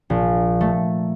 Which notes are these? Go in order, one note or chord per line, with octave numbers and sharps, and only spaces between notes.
A#1
A3